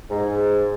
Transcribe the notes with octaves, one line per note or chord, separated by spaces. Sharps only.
G#2